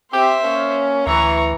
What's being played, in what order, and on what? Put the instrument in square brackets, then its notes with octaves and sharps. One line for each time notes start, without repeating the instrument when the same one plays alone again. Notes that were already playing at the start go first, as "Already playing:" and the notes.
[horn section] C4 G4 [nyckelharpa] C5 E5
[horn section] A#3 C#4
[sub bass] D2 [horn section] E3 [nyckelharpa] A#5 C#6